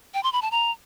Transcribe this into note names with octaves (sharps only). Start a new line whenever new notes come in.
G5
C6
B5
A5
A#5